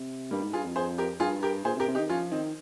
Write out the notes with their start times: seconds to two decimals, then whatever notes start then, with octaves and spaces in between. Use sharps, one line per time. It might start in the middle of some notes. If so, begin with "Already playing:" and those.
Already playing: C3
0.31 G2 G3 A#3
0.42 G#2
0.53 G2 F4 G#4
0.65 F2
0.76 G#4 C5
0.98 G4 A#4
1.20 G2 F4 G#4
1.43 G4 A#4
1.65 A#2 G#4 C5
1.76 C3
1.80 G4 A#4
1.88 C3
1.95 D#4 G4
1.99 D#3
2.09 F3 C#4 F4
2.32 D#3 C4 D#4